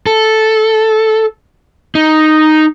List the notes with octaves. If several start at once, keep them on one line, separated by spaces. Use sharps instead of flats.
A4
D#4